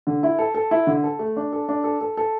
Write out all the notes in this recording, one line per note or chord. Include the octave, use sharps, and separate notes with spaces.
D3
E4
A4
A4
E4
D3
A4
A3
D4
A4
D4
A4
A4
A4